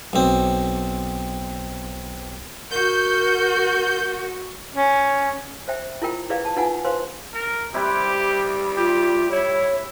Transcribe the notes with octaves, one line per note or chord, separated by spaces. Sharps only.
B1 C4
F#4 A#4 G6
C#4
C5 E5 G5
E4 F4 A#4 G5
E4 G#4 B4 D5 F5
A5
D#4 F4 B4 F#5 G#5
B4 C5 F5 C6
A#4
C3 G3 E4 G4 B4
F4 G4
E4 C#5